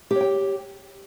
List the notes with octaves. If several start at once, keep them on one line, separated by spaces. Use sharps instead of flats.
G4 C#5 G5